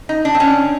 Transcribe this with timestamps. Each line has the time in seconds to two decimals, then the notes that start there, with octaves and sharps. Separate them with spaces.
0.09 D#4
0.25 D4
0.35 C4
0.40 C#4